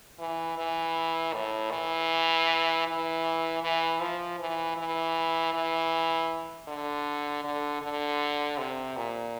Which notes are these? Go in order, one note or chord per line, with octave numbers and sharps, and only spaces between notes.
E3
E3
A2
E3
E3
E3
F3
E3
E3
E3
D3
D3
D3
C3
A#2